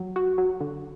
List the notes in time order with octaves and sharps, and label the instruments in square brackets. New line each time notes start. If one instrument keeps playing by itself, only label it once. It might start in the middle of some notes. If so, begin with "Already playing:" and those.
Already playing: [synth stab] F#3 F#4
F#4
F#3
D3